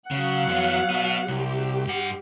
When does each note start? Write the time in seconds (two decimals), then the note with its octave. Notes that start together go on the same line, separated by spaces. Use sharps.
0.11 C#3 F#3 F5 F#5
0.48 F2 B3
0.90 B3 F#4
1.28 C2 G4
1.87 G2 F#5